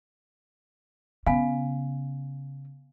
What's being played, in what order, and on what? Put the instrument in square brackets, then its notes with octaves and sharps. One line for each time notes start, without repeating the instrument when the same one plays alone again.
[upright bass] C#3 [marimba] B3 [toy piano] F5 G#5